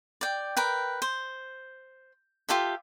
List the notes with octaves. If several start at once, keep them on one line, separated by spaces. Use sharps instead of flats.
D5 G5
A#4 B4 G5
C5
F4 G4 A4 E5